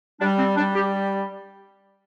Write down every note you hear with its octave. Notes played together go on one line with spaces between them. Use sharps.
G3 D4
C4
G3 D4
G4